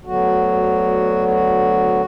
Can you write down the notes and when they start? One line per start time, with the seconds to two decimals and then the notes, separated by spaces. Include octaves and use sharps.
0.05 D2 D3 F#3 B3 F#4
1.28 F#4